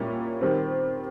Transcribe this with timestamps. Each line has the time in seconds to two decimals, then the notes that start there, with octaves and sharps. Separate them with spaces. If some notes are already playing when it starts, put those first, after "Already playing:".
Already playing: A#2 G3 A#3 C#4 E4
0.41 D#3 G3 C4